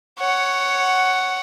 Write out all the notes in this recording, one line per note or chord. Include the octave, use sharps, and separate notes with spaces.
C#5 F#5